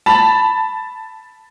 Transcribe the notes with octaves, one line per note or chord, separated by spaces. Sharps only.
A5 B5